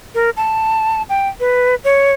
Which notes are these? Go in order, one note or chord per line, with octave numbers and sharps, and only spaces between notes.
A#4
A5
G5
B4
C#5